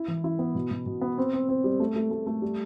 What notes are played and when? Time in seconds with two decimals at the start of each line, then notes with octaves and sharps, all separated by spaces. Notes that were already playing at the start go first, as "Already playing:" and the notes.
Already playing: E4
0.08 E3
0.24 E4
0.39 B3
0.55 B2
0.71 B2
0.86 B2
1.01 B3
1.18 C4
1.33 C4
1.49 C4
1.64 G3
1.80 A3
1.96 A3
2.11 A3
2.27 A3
2.42 G3